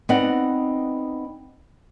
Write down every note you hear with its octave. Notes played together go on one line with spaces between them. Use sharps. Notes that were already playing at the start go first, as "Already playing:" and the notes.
B3 C4 D#4 D5 D#5 F#5